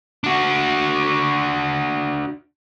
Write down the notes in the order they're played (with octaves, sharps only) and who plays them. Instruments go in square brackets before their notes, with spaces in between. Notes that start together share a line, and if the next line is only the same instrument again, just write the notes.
[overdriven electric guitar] D4 F#4